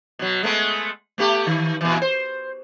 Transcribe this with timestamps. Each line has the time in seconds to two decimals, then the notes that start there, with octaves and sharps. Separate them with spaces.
0.19 B2 F#3
0.43 G#3 A3 B3
1.18 A3 B3 G4
1.47 D#3
1.81 A#2 E3
2.02 C5